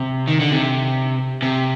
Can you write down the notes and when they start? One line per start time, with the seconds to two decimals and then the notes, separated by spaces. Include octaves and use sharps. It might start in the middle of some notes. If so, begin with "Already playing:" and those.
Already playing: C3
0.28 D#3
0.40 D3
0.52 C3
1.42 C3